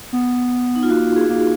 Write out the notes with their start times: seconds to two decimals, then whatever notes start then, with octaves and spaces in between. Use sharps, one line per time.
0.13 B3
0.76 D#4
0.83 F4
0.90 A#3 F#4
1.16 G#4
1.29 A#3